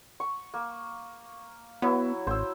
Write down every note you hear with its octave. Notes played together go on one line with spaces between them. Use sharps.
C#6
A#3
F#3 B3 E4
A1 C5 E6